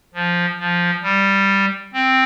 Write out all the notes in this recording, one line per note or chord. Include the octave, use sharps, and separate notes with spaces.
F3
F3
G3
C4